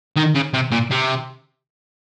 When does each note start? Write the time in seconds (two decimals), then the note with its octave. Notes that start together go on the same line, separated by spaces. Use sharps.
0.16 D#3
0.34 C#3
0.53 C3
0.72 A#2
0.91 C3